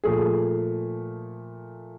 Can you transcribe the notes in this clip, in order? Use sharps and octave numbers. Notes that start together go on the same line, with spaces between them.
A#2 F3 A3 G#4